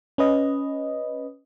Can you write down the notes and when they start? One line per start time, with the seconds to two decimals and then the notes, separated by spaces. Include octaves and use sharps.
0.18 C#4 B4 D#5